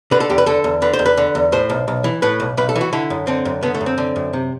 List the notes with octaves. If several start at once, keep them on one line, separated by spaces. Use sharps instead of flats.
D3 B4
A4
E2 G4
B4
D3 A4
E2
D3 B4
C5
E2
B4
D3
E2
A2 C5
B1
B1
E3
A2 B4
B1
B1 B4
A4
E3
F#4
D3 E4
F#2
D3 C4
F#2
D3 B3
A3
F#2
C4
D3
F#2
C3